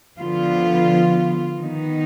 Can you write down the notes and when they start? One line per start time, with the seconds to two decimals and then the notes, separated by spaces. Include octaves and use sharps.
0.19 D3 F3 B3 F4
1.59 D#3 B3 D#4